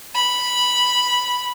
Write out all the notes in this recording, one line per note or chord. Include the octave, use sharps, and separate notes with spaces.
B5